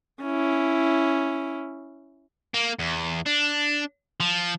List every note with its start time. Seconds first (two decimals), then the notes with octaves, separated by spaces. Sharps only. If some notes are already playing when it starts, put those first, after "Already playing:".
0.22 C#4 E4
2.54 A#3
2.79 E2
3.26 D4
4.20 F3